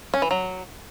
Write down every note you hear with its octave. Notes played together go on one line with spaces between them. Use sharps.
C#4
E3
F#3